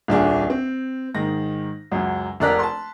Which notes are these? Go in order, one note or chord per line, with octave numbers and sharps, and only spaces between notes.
D#1 C2 D4 G#4
C4
G#2 D#3 A#6
C#2 F#2 F#3
F1 A#4 D5 A#5 F#6 B6
A5 C6